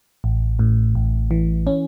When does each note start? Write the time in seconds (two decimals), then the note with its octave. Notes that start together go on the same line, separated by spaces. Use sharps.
0.24 A1
0.59 A2
0.95 A1
1.31 E3
1.67 C#4